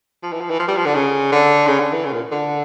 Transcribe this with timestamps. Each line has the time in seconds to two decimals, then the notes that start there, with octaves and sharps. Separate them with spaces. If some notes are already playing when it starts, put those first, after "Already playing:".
0.23 F3
0.33 E3
0.41 F3
0.50 E3
0.60 F3
0.68 G3
0.77 F3
0.86 D3
0.95 C#3
1.32 D3
1.67 C#3
1.79 D3
1.93 E3
2.05 C#3
2.13 A#2
2.32 D3